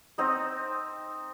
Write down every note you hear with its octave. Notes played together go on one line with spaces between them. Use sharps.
C4 D#4 D#5